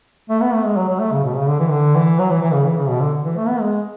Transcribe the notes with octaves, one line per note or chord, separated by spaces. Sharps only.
A3
B3
A3
G#3
F#3
F#3
A3
C#3
B2
C#3
D3
E3
D3
E3
F#3
E3
E3
C#3
E3
C#3
B2
D3
E3
A3
B3
G#3